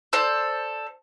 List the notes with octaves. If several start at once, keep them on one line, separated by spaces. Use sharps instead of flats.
A4 C5 D5